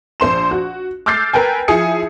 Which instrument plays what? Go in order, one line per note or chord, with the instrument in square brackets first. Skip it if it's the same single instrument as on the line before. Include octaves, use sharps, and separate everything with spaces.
[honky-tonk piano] A#1 C5 C6 E7
F#4
D6 E6 F6 G6 A6 C7
A#4 B4 G5 G#5
F3 E4 G#4 G#5 D#6 C#7